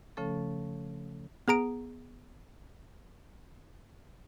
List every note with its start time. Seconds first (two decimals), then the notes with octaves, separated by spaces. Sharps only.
0.17 C#3 F3 A3 C#4 A4
1.48 B3 G#4 A#5 D7